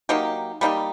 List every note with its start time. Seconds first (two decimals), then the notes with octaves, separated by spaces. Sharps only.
0.09 F#3 A#3 D#4 G4
0.61 G3 A#3 D#4 G4